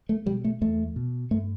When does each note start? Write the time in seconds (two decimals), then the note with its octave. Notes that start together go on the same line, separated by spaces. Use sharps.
0.09 A3
0.26 B2 G3
0.44 A3
0.61 E2 A3
0.96 B2
1.31 G2 A3